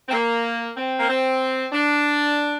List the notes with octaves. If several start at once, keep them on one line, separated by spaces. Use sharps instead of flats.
C4
A#3
C4
A#3
C4
D4